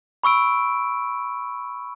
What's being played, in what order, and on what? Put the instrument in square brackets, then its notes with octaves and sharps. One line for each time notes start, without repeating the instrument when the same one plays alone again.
[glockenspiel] B5 C#6 E6 D7